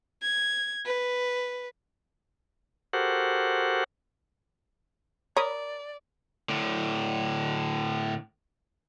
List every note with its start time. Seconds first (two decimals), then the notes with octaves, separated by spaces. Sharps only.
0.23 G#6
0.85 B4
2.93 F#4 G4 A4 A#4 C5 F#5
5.37 A#4 C#5 D5 B5 D#6
6.49 A2 D3